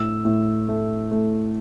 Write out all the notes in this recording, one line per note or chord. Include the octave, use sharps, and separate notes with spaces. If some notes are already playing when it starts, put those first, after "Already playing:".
Already playing: A2 E6
A2
A3
A3